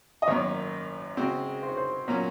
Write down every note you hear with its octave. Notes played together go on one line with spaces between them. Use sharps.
D#5
G#1 F#2 D#3 A#3 C#5
C#3 G#3 C4 F#4
C5
C#5
C5
A#2 F#3 A#3 C#4